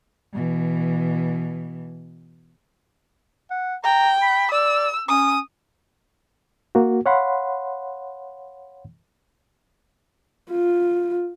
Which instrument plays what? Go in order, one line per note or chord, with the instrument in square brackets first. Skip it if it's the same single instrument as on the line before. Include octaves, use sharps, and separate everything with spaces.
[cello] B2 E3
[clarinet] F#5
[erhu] G5 [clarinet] A#5
[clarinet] B5
[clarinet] D5 [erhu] E6
[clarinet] C#4 [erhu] D#6
[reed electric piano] A#3 F#4
C#5 F5 F#5 B5 C6
[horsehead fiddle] F4